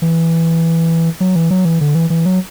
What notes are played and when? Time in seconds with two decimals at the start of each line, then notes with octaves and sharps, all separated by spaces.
0.02 E3
1.20 F#3
1.36 E3
1.51 F#3
1.65 E3
1.81 D3
1.95 E3
2.10 E3
2.26 F#3